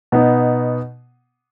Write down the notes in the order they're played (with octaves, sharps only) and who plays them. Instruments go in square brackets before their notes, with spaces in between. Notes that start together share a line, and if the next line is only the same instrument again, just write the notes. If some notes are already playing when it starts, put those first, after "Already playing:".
[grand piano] B2 B3 D#4